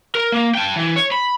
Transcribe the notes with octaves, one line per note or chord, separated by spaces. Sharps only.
A#4
A#3
G5 A5
E3
C#5
B5